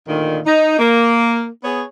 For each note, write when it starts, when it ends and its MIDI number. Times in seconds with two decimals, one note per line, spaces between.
0.08 0.41 38
0.08 0.41 46
0.08 0.41 51
0.46 0.78 63
0.79 1.49 58
1.64 1.84 59
1.64 1.84 68
1.64 1.84 73